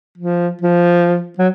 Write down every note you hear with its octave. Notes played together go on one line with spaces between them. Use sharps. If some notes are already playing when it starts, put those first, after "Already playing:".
F3
F3
F#3